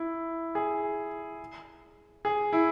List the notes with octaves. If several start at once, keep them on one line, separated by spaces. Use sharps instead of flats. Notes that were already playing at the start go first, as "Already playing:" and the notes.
Already playing: E4
G#4
G#4
E4